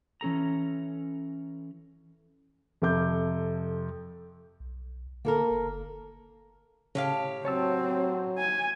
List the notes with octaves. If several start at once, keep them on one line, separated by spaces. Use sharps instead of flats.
E3 C#4 A4 A#5
F2 C3 A4 D6 G6
B1
D3 A#3 A4 A#4
F#1
A2 C#3 G4 F5
F#3 C4 C#5 A5 E6
G#5